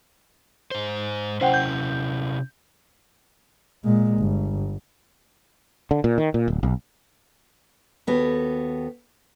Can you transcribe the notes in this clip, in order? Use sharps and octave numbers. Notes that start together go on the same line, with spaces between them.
G#2 C5
C3 C#4 E4 C5 F#5 G5
G6
A#2 G#3
G1
D3
A#2
D#3
A#2
D1
B1
D#2 B3 F#4 G4 A4